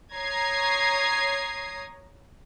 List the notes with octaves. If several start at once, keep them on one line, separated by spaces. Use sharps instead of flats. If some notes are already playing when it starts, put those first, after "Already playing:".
C#5 A#5 D#6 G#6 C7